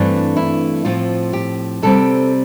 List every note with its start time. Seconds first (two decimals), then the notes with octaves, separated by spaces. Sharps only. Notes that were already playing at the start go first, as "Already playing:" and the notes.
Already playing: G2 E3 A3 C4 D4
0.37 E4
0.85 A2 F3 C4 F4
1.33 G4
1.82 C3 G3 C4 A4